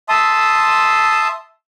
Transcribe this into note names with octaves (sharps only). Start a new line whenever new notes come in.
E5 A5 C6 D#6